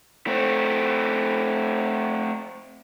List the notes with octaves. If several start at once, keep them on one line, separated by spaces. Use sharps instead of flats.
A3 C4